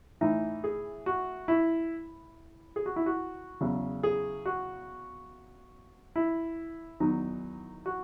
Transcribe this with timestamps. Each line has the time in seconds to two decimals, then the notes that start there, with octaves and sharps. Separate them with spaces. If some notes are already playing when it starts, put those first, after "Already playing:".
0.21 A2 E3 D#4
0.64 G#4
1.06 F#4
1.48 E4
2.76 G#4
2.86 F#4
2.96 E4
3.06 F#4
3.61 E2 C#3 F#3
4.03 G#4
4.46 F#4
6.16 E4
7.00 E2 D#3 F#3 D#4
7.86 F#4